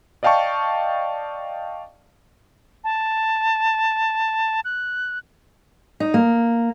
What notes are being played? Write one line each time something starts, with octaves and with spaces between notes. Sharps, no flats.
D5 D#5 F5 G5 A5 C#6
A5
F#6
D#4
A#3